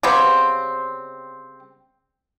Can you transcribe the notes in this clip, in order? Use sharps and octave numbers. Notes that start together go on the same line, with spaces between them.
C#3 G3 B3 C4